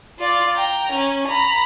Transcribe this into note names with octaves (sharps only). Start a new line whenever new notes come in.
F4 D5
G5 A#5
C#4
A#5 B5